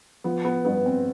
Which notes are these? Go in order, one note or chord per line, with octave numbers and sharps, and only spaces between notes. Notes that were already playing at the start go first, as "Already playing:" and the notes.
F3 B3
B3
G2 B3
C4